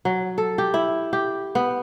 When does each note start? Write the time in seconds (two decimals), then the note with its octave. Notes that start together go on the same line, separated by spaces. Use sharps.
0.05 F#3
0.38 A4
0.58 G4
0.74 E4
1.13 G4
1.55 B3